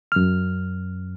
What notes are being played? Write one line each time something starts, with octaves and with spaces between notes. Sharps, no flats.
F#2 F6